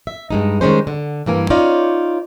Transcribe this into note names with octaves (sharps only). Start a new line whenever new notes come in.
E5
G2 G#3 D#4
D#3 G3 G#3 C#4 C5
D3
G2 E3 A#3 G#5
C#4 D#4 F4 C#5 D5